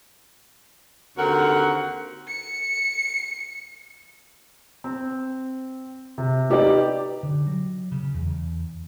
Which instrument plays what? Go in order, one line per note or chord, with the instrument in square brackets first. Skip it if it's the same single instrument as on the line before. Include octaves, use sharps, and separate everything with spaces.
[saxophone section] D#2 D3 C4 F#4 A#4 F#5
[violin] C#7
[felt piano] C4
C3
D#4 G4 B4 D5 D#5
[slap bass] D3
F#3
C#3
E2